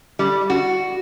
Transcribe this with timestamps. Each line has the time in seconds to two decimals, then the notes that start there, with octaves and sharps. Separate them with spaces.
0.19 G3
0.50 F#4